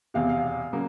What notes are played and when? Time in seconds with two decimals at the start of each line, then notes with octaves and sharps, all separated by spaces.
0.14 E1 E2 C3 F5
0.29 F5
0.73 C#3 F#3 A#3